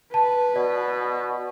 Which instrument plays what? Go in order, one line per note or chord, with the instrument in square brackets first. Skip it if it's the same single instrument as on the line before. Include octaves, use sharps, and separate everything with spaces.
[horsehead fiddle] B4 [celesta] A5
[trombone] B2 [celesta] D5